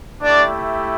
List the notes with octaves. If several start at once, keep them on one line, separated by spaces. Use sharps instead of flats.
A3 D4 E4 G4 D5